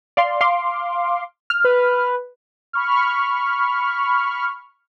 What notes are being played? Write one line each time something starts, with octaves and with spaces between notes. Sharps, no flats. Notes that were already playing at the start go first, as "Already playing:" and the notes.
D5 F5 C6
F5 C6 D6
F6
B4
B5 C#6 F6